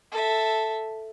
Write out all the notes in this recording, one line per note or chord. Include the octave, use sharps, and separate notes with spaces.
A4 E5